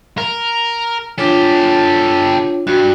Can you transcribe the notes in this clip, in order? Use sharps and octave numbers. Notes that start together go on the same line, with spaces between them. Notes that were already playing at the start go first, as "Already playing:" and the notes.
A#4
D4 F4 G4 A4 C#5
G2 F#4